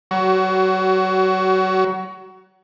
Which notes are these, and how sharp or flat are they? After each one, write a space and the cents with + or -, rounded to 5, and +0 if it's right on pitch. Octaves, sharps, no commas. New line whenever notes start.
F#3 +35 F#4 +20